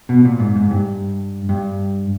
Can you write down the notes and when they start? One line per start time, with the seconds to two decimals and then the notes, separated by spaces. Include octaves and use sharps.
0.09 B2
0.25 A#2
0.40 G#2
0.56 G#2
0.71 G2
1.49 G2